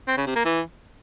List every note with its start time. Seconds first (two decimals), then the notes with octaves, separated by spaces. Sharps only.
0.08 C4
0.17 C#3
0.26 C3
0.36 A#3
0.45 E3